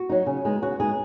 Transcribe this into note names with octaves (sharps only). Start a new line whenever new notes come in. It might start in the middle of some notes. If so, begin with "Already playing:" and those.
Already playing: F#4
F#3 D#4
C#3
G#3 B3 D#4
C#3 F#4
G#3 B3 D#4 G#4